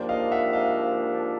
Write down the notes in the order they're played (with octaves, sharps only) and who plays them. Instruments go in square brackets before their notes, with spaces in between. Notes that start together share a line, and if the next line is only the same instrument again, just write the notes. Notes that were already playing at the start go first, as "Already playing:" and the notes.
Already playing: [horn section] G#2 F3 A#3 D4 G4 [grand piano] C5 D5
[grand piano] D#5 F5
E5 F#5
D#5 F5